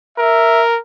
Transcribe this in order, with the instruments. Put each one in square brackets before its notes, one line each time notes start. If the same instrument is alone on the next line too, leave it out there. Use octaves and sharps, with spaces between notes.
[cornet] A#4 [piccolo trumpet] E5